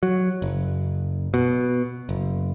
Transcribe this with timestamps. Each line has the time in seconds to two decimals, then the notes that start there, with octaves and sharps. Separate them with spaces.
0.03 F#3
0.42 F#1
1.34 B2
2.09 F#1